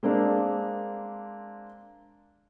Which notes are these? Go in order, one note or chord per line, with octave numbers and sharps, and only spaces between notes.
G#3 A#3 C4 D4